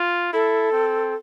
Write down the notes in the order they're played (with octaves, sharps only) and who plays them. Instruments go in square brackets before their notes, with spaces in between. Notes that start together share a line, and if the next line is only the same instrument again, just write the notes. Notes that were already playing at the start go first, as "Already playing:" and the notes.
Already playing: [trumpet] F4
[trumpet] E4 [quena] A4
[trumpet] C4